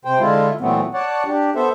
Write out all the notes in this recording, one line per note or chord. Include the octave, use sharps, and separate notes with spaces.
C3 C5 G5
D3 G#3 E4 F4
A#2 E3 F#3 A3 B3 C4
C#5 D5 F#5 A5
D4 G4
B3 A4 C5 E5